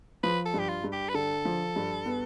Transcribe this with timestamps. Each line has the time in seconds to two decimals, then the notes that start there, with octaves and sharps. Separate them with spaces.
0.23 F3 B4
0.46 A4
0.54 G2
0.59 G4
0.69 F4
0.84 G2
0.92 G4
1.09 B4
1.14 D3 A4
1.45 F3
1.76 G2
2.05 B3